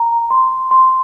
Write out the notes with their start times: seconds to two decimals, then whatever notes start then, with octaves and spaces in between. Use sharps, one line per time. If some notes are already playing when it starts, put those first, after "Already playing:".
Already playing: A#5
0.31 C6
0.71 C6